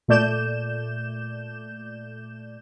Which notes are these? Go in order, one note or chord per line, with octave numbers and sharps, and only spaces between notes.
A#2 A3 D5 G6 E7